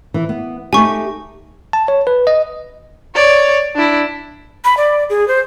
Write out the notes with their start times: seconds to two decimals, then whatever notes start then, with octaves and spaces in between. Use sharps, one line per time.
0.14 E3
0.29 B3
0.73 A3 D#4 G4 G#5 C#6
1.73 A5
1.88 C#5
2.07 B4
2.27 D#5
3.15 C#5 D5
3.76 D4 E4
4.64 B5
4.77 D5
5.10 G#4
5.28 C5